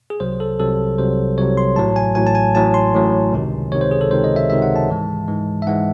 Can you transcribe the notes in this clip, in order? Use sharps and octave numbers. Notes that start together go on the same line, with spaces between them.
G#4
C2 C3 F#3 C5
A4
C2 C3 F#3 A4
C2 C3 F#3 C5
C2 C3 F#3 C#5
C6
A1 A2 F#3 A5
G#5
A1 A2 F#3 G#5
A5
G#5
A1 A2 F#3 A5
C6
A1 A2 F#3
C#2 C3 D#3
C#2 C3 D#3 C#5
C5
G#4
A4
C#2 C3 D#3 C5
D#5
E5
C#2 C3 D#3 E5
F#5
A5
G#2 E3 G#3
G#2 E3 G#3
E5
G#2 E3 G#3 F#5